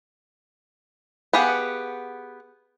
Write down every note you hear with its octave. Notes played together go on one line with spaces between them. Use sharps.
B3 G4 G#4 F5 F#5